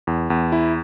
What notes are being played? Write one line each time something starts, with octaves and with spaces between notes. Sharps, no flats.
E2
E2
E4